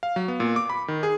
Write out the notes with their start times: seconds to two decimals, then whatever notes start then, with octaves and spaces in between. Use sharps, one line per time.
0.03 F5
0.16 F#3
0.28 B3
0.40 A#2
0.56 D6
0.70 B5
0.88 D#3
1.03 G#4